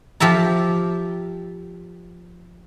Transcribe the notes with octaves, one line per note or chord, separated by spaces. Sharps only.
F3 G4 E5 A#5